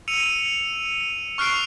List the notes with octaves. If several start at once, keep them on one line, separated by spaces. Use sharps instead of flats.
E6 C#7 D#7 F7
C#6 F6 F#6 C7 D7 F7